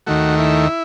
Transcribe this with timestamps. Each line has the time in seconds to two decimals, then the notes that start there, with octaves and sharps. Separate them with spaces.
0.07 D#2 D#3 A3 F#4
0.38 E4